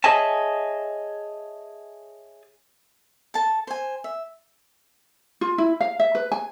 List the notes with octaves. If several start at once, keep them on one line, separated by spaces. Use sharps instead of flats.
G#4 C#5 D#5 E5 G#5 A5
A4 A5
C5 G#5
E5
F4
E4
F5
E5
B4
G#5